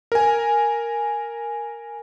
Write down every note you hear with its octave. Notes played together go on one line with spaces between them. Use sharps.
A#4 G#5